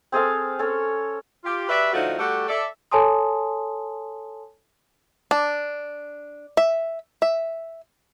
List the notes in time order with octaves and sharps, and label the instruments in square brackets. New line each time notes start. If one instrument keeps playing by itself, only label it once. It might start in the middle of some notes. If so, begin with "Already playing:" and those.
[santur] C4 G#4 A4 F5
C#4 A4 C#5
[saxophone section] F4 G4
F#4 G4 B4 D5 E5
A2 D3 F3 A3 D#4 F#4
G3 A3 F#4 G4 A4
A4 D5 E5
[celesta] A4 C#5 G#5 A5 C6 D#6
[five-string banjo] D4
E5
E5